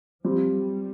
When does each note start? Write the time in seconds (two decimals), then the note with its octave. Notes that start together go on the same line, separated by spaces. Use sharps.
0.25 F3 G3 C4 F4
0.54 G3